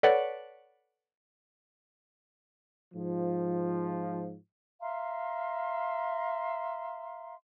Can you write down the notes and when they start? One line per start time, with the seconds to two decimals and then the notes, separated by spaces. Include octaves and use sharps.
0.03 A4 B4 C#5 D5 F#5
2.94 G#2 F3
4.81 E5 F5 A#5 C6